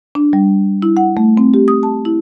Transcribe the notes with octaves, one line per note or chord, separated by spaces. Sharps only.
D4
G3
E4
F#5
A3
C4
G4
D#6
A5
E4